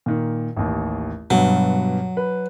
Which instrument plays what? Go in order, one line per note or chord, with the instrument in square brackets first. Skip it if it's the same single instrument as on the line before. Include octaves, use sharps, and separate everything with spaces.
[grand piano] A#2 D#3
A1 D#2
[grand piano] G2 B2 [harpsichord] F#3
[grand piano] B4